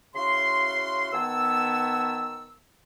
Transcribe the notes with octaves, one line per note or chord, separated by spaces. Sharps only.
C#3 E4 F#4 F5 C6
D#3 B3 G#5 A5 E6